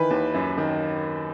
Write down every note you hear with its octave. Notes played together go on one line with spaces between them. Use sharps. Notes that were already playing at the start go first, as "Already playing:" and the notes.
Already playing: D#3 E3 B4
D#2
F#2
D#3